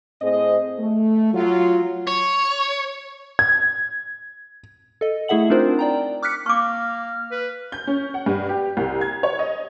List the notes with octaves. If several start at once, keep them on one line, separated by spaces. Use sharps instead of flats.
A2 C4 G#4 C5 D#5
A3
F#3 F4
C#5
G#6
A4 D#5
A3 E4 G#4 E5 F#5 F#7
C4 D4 D#4 F4 A#4 C5
D5 G5 A#5
D6 F6 F#6 B6 C#7
A#3 C#6 D6 F6
B4
G6
C#4
F#5
G2
G4
C2
G#6
C#5
D#5